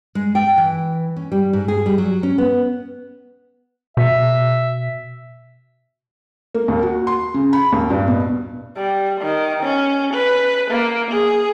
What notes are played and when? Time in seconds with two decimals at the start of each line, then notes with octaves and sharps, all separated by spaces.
0.15 G#3
0.35 G5
0.58 E3
1.17 C#4
1.32 G3
1.53 G#2
1.68 G#4
1.86 G3
1.98 F#3
2.23 C#4
2.38 B3
3.97 B2 E5
6.54 A#3
6.68 D#2
6.83 F#4
7.07 C6
7.34 C#3
7.53 B5
7.72 D#2
7.90 G2
8.08 B2
8.77 G3
9.21 D#3
9.64 C#4
10.14 B4
10.71 A#3
11.12 G#4